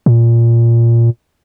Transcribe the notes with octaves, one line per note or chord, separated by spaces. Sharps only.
A#2